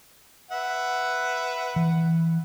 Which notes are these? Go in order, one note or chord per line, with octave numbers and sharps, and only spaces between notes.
B4 E5 F#5
E3